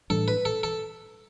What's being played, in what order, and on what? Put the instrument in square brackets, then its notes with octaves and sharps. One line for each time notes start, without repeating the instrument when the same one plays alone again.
[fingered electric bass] A2 E3 G3 D4 [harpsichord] A4
[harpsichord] B4
A4
A4